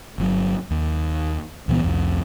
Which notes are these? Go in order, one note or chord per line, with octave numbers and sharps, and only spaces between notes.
G1 C3 F#3
D#2
C#2 A#2 E3 B3
C2 F2